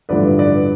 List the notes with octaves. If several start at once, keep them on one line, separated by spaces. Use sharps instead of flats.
A1 G2 D3 F3 A3 B4 D5
B4 D5